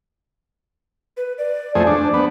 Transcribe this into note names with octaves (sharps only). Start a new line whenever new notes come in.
B4
D5
F2 A3 G#4 C5
D4
B3 C5